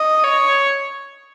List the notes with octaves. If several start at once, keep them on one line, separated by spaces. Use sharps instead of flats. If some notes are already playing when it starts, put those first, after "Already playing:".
Already playing: D#5
C#5